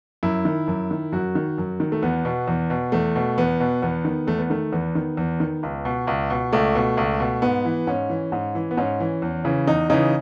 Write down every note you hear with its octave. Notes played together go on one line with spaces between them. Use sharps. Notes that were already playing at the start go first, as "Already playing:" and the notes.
F#2 E4
D#3
F#2
D#3
F#2 F#4
D#3
F#2
D#3
A3
E2 B3
B2
E2
B2
E2 A3
B2
E2 B3
B2
E2 B3
D#3
E2 A3
B3
D#3 A3
E2 B3
D#3
E2
D#3
C#2
B2
C#2
B2
C#2 A3
B2
C#2
B2
G#2 B3
E3
G#2 C#4
E3
G#2
E3
B3
G#2 C#4
E3
E2
C#3 E3
E2 D#4
C#3 E3 D#4